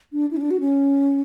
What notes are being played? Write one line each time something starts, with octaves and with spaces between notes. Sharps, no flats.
D4
E4
C#4
D4
F#4
C#4